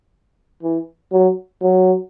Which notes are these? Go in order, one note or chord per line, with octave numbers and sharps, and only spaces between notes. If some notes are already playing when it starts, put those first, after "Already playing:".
E3
F#3
F#3